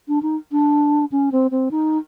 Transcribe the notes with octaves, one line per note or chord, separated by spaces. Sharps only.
D4
D#4
D4
C#4
C4
C4
D#4